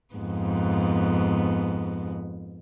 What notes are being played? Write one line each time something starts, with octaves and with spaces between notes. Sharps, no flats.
F2 G#2 B3